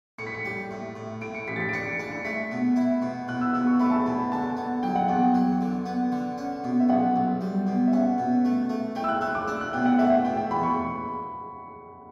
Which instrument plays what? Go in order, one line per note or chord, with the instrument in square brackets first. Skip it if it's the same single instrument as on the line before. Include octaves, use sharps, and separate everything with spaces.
[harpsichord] A2 [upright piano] C#7
[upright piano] B6
C#7
[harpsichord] G3
A2
A2
[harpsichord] A2 [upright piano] D7
[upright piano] C#7
[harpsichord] A1 [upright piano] B6
[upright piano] A6
B6
D7
[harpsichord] D4 [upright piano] C#7
[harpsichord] D4 [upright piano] C#7
[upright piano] C#7
[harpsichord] A3 [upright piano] B6
[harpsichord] B2
E4
B2
[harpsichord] B2 [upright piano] F#6
[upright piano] E6
[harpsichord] B2 [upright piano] E6
[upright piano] C#6
[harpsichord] A3 [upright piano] B5
[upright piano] A5
B5
[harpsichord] B2
[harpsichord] D3 [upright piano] A5
[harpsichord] B3
[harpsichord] F#3 [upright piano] G5
[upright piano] F#5
[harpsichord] E2 [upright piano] G5
[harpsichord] F#3
D3
B3
D3
C#4
B2
[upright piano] E5
[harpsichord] B1 [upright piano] F#5
[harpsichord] B1
G3
B2
[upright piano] E5
[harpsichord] C#4 [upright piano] F#5
[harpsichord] B2
A3
A3
[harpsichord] A3 [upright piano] G5
[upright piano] E6
F#6
[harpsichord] A3 [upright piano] E6
[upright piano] D6
[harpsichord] D4 [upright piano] E6
[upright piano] F#6
[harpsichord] B2 [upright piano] G5
[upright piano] F#5
[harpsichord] A3 [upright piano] E5
[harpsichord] B2 [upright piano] G5
[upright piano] G5
[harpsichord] E2 [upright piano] B5
[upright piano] C#6